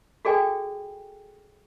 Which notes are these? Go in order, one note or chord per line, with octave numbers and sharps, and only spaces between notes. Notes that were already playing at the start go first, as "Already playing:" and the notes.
F#4 G#4 A4 D5 G5 G#5